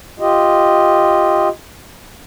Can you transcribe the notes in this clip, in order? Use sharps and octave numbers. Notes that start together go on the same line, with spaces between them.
F4 G4 D#5